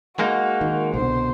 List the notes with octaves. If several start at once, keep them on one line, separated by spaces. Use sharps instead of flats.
G#3 A#3 D#4 F#4
D#3
C2 B2 D3 C5